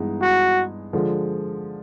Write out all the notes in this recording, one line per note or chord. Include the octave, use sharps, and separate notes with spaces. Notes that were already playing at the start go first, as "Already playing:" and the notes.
Already playing: G2 E3 G#3 B3 D#4
F#4
D3 F3 G#3